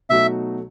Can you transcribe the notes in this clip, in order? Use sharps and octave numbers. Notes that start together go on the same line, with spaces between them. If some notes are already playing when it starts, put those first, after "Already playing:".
B2 F#3 A3 D#4 F#4 E5